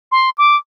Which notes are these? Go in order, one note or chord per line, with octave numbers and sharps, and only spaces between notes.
C6
D6